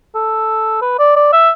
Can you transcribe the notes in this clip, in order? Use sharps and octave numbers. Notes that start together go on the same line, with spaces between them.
A4
B4
D5
D5
E5